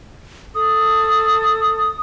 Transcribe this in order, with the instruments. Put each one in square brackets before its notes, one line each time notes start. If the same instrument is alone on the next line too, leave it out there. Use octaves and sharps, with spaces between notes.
[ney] A4 [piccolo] D#6